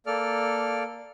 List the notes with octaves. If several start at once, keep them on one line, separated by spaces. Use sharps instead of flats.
A#3 A4 D5 F6